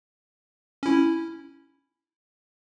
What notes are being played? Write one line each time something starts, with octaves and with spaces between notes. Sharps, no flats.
C#4 E4